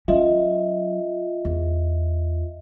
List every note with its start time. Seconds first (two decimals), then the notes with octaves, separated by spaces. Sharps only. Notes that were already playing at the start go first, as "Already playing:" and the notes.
0.08 F#3 C#4 F4 D#5 E5
1.45 E2